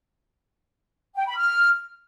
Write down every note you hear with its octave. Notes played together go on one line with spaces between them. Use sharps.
G5
B5
F6